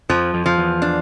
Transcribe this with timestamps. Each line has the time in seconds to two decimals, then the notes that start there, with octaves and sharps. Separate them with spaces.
0.09 F2 F3
0.34 F2
0.46 F3
0.58 E2
0.82 D4